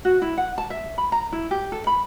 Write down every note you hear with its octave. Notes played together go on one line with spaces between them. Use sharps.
F#4
E4
F#5
A5
E5
B5
A#5
E4
G4
A4
B5